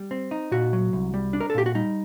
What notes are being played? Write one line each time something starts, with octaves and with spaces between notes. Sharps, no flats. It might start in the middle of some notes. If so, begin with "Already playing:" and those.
Already playing: G3
C4
D#4
A#2 F#4
F#3
C2
G3
D4
A#4
A4
A#2 G4
F#4
G3 D#4